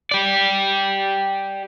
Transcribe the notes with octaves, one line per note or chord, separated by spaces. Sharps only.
G4 D5